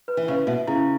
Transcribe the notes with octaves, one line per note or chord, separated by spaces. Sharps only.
B4
E3
C#3 B4
B2 E5
C#3 E4